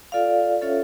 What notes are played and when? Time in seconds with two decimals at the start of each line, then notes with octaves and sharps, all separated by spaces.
0.12 F4 A4 D5 F5
0.62 C#4 F4 A4 C#5 E5